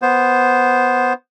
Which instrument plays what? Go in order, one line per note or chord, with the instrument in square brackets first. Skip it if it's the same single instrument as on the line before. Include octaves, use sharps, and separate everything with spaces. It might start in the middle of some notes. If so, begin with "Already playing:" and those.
[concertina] B3 C5